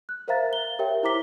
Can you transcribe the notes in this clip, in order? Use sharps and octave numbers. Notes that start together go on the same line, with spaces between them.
F#6
A#4 C5 E5 F5 A#5 A6
G7
G4 A#4 C#5 E5 G5
E4 C5 A#5 D6 B6 G7